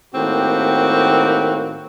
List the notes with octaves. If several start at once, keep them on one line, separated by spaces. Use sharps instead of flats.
A2 D#3 A#3 C4 F#4 G4